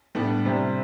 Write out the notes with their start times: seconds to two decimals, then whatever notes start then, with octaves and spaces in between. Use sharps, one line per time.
0.15 A2 G3 B3 D4
0.45 C3 G3 C4 E4